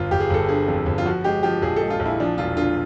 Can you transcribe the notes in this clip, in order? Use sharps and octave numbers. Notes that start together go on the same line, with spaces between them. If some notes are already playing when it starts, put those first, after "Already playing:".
Already playing: G1 F4
G1 G4
G#4
G1 A4
D3 G#4
F2
G1
F4
F3 F#4
G#3 G4
F3 G4
A#1 G#4
A4
G#3
F4
A#1
E4
F3 D4
E1 F4
D3 F4